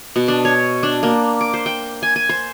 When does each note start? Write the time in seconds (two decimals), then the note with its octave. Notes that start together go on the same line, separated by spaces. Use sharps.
0.16 B2
0.28 D4
0.45 C#5
0.83 D4
1.03 A#3
1.41 D6
1.54 C5
1.66 G5
2.03 G#5
2.16 G#5
2.29 C5